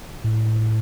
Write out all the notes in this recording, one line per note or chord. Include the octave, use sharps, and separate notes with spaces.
A2